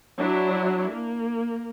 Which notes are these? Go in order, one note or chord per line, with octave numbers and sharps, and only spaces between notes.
F#3 D4 E4
A#3